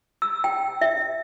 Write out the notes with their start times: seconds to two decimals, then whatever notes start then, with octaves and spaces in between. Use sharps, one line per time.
0.22 E6
0.44 G5
0.81 E5